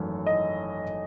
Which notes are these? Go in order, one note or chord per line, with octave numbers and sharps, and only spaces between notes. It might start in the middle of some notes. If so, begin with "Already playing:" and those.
Already playing: G#1 F#2 E3 A3
D#5